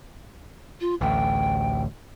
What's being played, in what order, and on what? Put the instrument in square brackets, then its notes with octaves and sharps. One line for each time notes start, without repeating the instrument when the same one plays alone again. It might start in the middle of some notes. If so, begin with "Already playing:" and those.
[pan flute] F4
[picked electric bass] A1 D2 [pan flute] G5